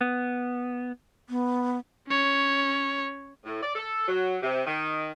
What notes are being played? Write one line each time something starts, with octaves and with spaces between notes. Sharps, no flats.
B3
B3
C#4 C#5
A2
D5
A4
F#3
C3
D#3